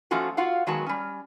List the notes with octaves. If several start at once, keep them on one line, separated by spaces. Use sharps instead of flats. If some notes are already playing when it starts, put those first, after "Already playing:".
F3 A3 A#3 C#4 F4 F#4
F4 F#4 F5 F#5
D#3 F#3 G#3 B3 F#4 A5
G3 C#4